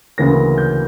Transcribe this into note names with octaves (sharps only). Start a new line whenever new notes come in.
D2 C#3 E3 A#3 A#6
G6